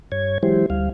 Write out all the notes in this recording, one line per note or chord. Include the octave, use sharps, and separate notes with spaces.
G2 C#5 G#6
E3 F#3 G#3 E4 G4 C5
D2 G3 F5